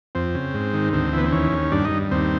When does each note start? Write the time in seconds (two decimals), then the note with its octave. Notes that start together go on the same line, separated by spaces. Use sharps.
0.15 F2 C4
0.35 C#3
0.54 G#2
0.73 D#3
0.93 D2 C4
1.13 E3
1.18 B3
1.25 C4
1.32 D#2 C#4
1.52 D#2
1.72 G2 D4
1.85 D#4
1.91 G2
2.11 D#2 C4